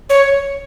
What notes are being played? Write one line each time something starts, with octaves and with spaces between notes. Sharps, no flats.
C#5